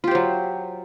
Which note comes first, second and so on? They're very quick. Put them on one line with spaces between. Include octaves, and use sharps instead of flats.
F4 G4 C5 F#3